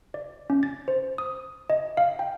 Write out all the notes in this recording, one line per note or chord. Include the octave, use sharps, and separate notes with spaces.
D5
C#4
A6
C5
D#6
D#5
F5
G5